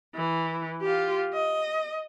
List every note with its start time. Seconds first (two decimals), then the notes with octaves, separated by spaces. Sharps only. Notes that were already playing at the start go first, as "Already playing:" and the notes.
0.15 E3
0.81 F4 G4
1.33 D#5